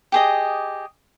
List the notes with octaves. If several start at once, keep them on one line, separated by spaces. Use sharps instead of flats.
G4 G#4 D#5